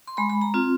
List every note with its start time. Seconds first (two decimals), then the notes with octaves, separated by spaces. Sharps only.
0.07 C6
0.17 G#3 B5
0.30 B5
0.41 A#5
0.54 C4 F4